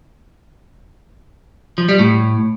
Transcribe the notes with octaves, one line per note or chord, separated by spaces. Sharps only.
F3
G3
A2